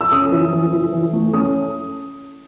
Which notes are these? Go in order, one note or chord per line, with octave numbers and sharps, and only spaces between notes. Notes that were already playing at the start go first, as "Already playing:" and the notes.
E6
C#4 D#6
E3
E3
E3
E3
A3
C#4 D#6